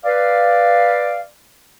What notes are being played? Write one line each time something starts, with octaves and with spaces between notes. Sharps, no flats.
B4 D5 F5